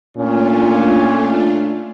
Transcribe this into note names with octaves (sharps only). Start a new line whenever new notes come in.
A#2 A3 C#4 D4 F4